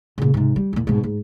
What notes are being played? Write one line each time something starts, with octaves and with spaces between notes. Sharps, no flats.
A#2 C#3
G#2 C3
G3
E2 A#2
G#2 B2
G#2